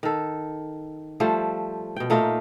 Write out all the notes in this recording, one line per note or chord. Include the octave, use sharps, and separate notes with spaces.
D#3 A4
F3 G3 A3 C5
B2 G5
A#2 A3 D#4 F5